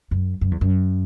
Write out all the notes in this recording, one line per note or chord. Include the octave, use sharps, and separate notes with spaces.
F#2
F#2
E2
F#2